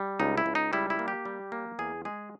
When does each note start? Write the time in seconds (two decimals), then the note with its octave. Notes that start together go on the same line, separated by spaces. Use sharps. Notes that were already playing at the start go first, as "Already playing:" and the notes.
Already playing: G3
0.20 C#2 D#4
0.38 E4
0.46 C#2
0.55 D#4
0.73 G3 E4
0.90 E4
0.99 A#3
1.08 G4
1.25 G3
1.52 A#3
1.79 E2 G#4
2.05 G#3 G#4